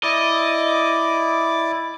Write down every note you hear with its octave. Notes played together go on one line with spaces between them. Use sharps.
E4 D5 D#5 D6